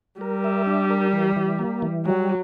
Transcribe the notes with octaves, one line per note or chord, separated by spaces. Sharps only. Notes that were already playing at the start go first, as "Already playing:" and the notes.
G3 A#4
E5
D4
A#4
E3
E3
A#3
E3
F#3 G3